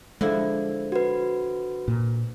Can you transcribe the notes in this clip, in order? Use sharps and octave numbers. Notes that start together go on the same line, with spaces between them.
D3 F3 G#3 E4
F#4 B4
A#2